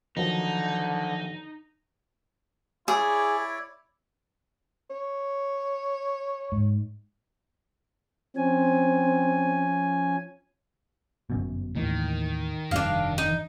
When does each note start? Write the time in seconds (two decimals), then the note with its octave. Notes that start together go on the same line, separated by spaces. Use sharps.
0.17 D3 D#3 F3 F#3 D#4
2.88 E4 G#4 C#5 D5
4.90 C#5
6.52 G#2
8.36 F3 C4 C#4 G#5
11.30 G1 F#2 B2
11.75 D#2 A2 D#3 E3
12.71 F1 G2 G3 D4 F5
13.18 D#4